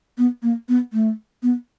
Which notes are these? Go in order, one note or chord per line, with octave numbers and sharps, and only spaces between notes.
B3
A#3
B3
A3
B3